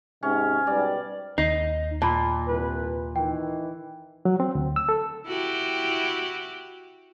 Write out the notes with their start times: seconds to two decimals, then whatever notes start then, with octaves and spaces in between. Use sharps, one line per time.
0.23 G#2 C3 C#4
0.67 G#2 B2 G3 D5
1.38 D#2 D#4 C7
2.02 A#2 A5 B5
2.48 C2 B4
3.16 D#3 E3 G5
4.25 F#3
4.40 C4
4.55 D2
4.76 E6
4.89 A4
5.27 E4 F#4 G4